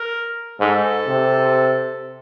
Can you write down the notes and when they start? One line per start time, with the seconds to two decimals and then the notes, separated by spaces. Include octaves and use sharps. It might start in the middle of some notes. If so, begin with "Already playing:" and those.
Already playing: A#4
0.59 G#2 A4
1.08 C3